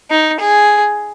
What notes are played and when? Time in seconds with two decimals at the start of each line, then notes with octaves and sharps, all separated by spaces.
0.11 D#4
0.40 G#4